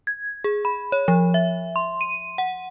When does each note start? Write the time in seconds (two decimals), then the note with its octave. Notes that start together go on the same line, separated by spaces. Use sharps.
0.07 G#6
0.44 G#4
0.65 B5
0.92 C#5
1.08 F3
1.34 E5
1.76 C6
2.01 D#7
2.38 F#5